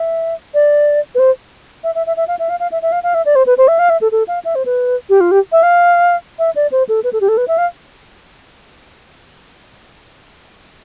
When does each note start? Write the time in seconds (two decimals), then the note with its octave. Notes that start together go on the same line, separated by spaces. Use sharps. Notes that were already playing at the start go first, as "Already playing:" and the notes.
Already playing: E5
0.54 D5
1.15 B4
1.19 C5
1.84 E5
1.95 E5
2.07 E5
2.17 E5
2.28 F5
2.39 E5
2.49 F5
2.60 F5
2.72 E5
2.82 E5
2.92 F5
3.03 F5
3.14 E5
3.25 D5
3.35 C5
3.46 B4
3.58 C5
3.68 E5
3.79 F5
3.89 E5
4.01 A4
4.12 A4
4.28 F5
4.45 E5
4.55 C5
4.66 B4
5.09 G4
5.20 F4
5.31 G4
5.52 E5
5.63 F5
6.39 E5
6.56 D5
6.72 C5
6.89 A4
7.04 B4
7.13 A4
7.21 G4
7.28 A4
7.37 B4
7.48 E5
7.58 F5